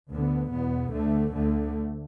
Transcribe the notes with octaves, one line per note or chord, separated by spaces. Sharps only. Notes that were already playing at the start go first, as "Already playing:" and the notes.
D2 D3 B3
E2 B2 B3
D2 D3 A3
D2 D3 A3